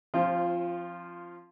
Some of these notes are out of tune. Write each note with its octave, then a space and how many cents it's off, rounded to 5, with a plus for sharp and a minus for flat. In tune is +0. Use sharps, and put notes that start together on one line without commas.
F3 +0 C4 +30 F4 -10